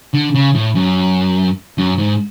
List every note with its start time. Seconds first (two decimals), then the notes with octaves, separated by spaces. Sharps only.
0.14 D3
0.35 C#3
0.55 A2
0.75 F#2
1.78 F#2
1.98 G#2